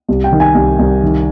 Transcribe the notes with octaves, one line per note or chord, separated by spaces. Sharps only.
C2
G5
D#3
G#5
C2
C2
D#3